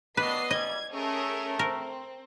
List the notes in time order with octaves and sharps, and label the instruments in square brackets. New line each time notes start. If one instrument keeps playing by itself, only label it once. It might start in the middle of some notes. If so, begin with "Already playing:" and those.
[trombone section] D#3 F#3 D4 [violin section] B3 D#5 C7 [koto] B4
[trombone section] G#1 G#2 G3 [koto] D#5 [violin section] G#6
[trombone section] A3 [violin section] C#4 G#4 A#4
[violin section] C4 [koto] A#4